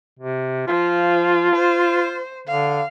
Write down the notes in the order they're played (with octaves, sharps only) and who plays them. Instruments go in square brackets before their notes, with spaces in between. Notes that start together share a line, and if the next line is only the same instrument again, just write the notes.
[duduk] C3
[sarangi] F3 [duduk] F4
[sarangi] C5
[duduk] D3 [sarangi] F5